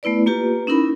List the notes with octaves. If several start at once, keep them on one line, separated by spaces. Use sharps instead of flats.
A3 B3 E4 B4 D5
A#3 F4 G4 B4
C#4 D#4 E4 A#4 B5